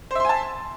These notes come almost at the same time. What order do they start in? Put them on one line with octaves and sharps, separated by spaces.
C5 E5 C6 G#5 A5